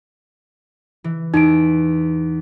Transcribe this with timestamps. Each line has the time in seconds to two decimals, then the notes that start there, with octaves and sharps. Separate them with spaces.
1.04 E3
1.34 E2 D#4 D7